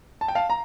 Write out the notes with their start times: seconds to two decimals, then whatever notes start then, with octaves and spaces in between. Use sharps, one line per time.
0.21 A5
0.28 G5
0.35 F5 A5
0.50 A#5